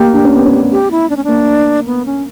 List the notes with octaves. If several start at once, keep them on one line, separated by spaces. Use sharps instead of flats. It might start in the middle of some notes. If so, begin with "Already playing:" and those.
Already playing: A#3 G4
D4
C#4
B3
C#4
G4
E4
D4
C#4
A#3 D4
B3
C#4